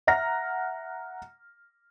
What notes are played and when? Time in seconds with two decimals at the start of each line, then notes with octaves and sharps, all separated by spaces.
0.07 E5 F#5 A#5 F6 A#6